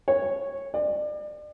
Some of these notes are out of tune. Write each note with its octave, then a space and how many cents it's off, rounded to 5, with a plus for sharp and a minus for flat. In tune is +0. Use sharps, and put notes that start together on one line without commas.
C#5 -5
D5 +35